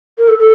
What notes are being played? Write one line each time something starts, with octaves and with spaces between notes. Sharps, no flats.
A#4
A4
A4